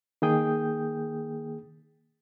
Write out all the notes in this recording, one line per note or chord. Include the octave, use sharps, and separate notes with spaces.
D#3 A#3 G#4 G5 D#6 G6